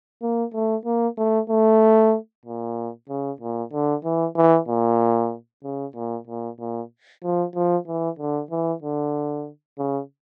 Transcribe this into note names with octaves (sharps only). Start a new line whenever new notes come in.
A#3
A3
A#3
A3
A3
A#2
C#3
A#2
D3
E3
E3
A#2
C#3
A#2
A#2
A#2
F3
F3
E3
D3
E3
D3
C#3